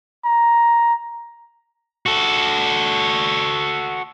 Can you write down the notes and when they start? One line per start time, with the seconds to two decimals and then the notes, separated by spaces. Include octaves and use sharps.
0.25 A#5
2.06 F#4 A4